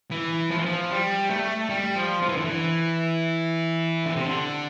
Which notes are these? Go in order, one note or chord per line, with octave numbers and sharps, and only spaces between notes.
E3
F3
E3
F3
G3
A3
G3
F3
F3
E3
D3
E3
D3
C3
D3